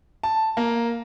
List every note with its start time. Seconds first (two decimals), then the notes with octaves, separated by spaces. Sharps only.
0.23 A5
0.57 A#3